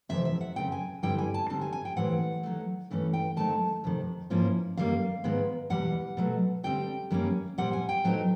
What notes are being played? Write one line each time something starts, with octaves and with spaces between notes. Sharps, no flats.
F2 C3 E3 C4 E5
E5
F#5
F#2 C#3 F#3 A3 C4 G5
G#5
G2 D3 G3 C4 E4 G5
G#5
A5
D3 G3 C4 D#4 A5
G#5
G#5
G5
A2 E3 G3 C4 F#5
D#3 F#3 A3
G2 E3 A3 C#4
G5
D#3 F#3 A3 C4 D#4 A5
F2 C3 D#3
G#2 F3 A#3 C#4 E4
F#2 D#3 G3 A#3 F5
G#2 D#3 G#3 B3
E2 B2 G3 F#5
B2 F#3 A3
D3 G3 C4 G5
F#2 D#3 G3 A#3 C#4
A#2 G3 C4 F#5
G#5
G5
A2 F#3 A3 C4 D#4